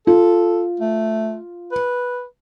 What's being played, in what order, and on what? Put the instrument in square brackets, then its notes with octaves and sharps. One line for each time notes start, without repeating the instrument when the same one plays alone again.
[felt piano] F4 [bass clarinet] A4
[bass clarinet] A3
B4